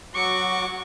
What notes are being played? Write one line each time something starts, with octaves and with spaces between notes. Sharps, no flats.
F#3 F#4 C#6 D6